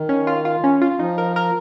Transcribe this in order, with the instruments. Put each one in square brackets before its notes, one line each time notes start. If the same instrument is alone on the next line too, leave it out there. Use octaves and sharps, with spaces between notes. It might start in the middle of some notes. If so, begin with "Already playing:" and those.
Already playing: [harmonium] D#3
[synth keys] C#4
F4
F4
C#4
F4
[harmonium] F3 [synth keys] D#4
[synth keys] A#4
A#4